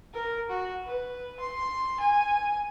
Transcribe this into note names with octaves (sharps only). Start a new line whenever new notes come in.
A#4
F#4
B4
C6
G#5